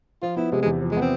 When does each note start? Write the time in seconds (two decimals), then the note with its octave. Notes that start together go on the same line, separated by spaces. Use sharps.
0.22 F3 F4
0.36 B3 E4
0.52 C3 G#3
0.62 G#3
0.66 E2
0.81 F3
0.91 G#3
0.97 B3 C4